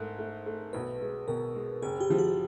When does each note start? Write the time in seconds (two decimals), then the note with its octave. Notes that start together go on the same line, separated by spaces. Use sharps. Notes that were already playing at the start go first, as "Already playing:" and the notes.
Already playing: G#2 A3 A#4
0.19 A3
0.46 A3
0.73 B1 B4
1.01 G#3
1.28 B2 A#4
1.55 G#3
1.82 F#1 G#4
2.01 G4
2.10 F3
2.18 F#4